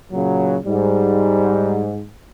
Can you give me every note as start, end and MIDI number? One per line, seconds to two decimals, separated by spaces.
0.12 0.57 46
0.12 0.57 49
0.12 0.57 54
0.65 2.03 44
0.65 1.91 55